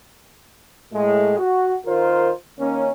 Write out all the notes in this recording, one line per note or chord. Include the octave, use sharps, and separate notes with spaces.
A2 G#3
F#4
D#3 F4 A#4 C5
D#3 A#3 C#4